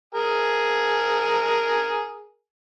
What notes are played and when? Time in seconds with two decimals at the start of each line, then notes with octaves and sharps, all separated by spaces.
0.15 G#4 A#4 G#5